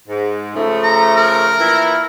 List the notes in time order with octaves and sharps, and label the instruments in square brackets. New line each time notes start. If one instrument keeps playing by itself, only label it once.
[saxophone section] G#2
C#3 F3 A3
[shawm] A#5
A#4
[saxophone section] A#2 E3 E4